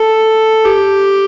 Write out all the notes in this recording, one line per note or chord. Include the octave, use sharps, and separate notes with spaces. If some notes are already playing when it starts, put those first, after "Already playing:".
Already playing: A4
G4